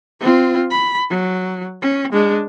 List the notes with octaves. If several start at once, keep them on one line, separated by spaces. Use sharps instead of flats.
C4 F4
B5
F#3
C#4
G#3 D4